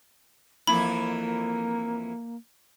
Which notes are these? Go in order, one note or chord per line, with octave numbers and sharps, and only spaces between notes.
F2 E3 A#3 E4 B5